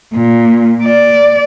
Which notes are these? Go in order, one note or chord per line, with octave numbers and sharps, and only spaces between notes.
A#2
D5